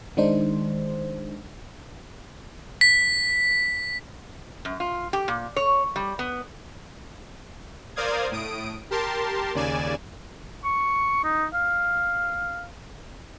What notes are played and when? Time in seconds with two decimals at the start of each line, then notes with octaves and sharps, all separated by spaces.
0.17 D#3 G#3 D4 D#4 C5
2.81 B6
4.65 F#2
4.80 F4
5.13 G4
5.28 A#2
5.56 C#5
5.96 G3
6.19 B3
7.96 A#4 C5 D5 F5 D#6 G#6
8.31 A2 D#6 D7
8.91 G4 A#4 A5 C6
9.54 D#2 C#3 D5 G#5 E7
10.64 C#6
11.24 D#4
11.54 F5